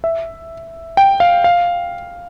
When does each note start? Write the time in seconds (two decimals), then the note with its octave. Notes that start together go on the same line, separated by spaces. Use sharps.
0.04 E5
0.97 G5
1.20 F5
1.44 F5